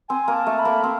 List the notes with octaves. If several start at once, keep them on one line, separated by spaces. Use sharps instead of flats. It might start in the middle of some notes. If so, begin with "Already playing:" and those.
C4 G#5
A#3
A5
A3
B5
A#3
C4